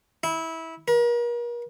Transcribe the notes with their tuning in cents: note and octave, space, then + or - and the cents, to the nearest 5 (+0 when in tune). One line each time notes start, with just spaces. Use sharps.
E4 -20
A#4 +40